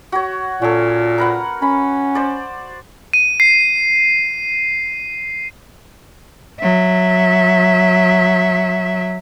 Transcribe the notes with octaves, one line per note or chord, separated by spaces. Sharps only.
F#4 C#5
A#2 C#4 A4
A#4 B4 F#5
C#4 B5
C5 D5
D#7
C7
F#3 E5